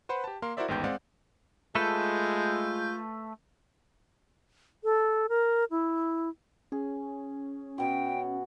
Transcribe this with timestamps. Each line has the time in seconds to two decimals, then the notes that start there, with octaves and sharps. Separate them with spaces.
0.09 B4 C5 F#5 B5
0.24 G4 A5
0.42 A#3 A#4 F5 C6
0.57 E4 F#4 A#4 C5 D5 E5
0.68 A1 D#2 G#2 B3 G5 G6
0.84 G#3 C4 D5 F5 F#5
1.75 G#3 A3 F4 A4 B4 G6
4.84 A4
5.29 A#4
5.71 E4
6.72 C#4 G#4
7.78 B2 F#4 G5